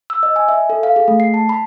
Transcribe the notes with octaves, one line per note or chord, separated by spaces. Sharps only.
E6
D#5
G#5
E5
A4
F5
G#4
A3
C7
A5
B5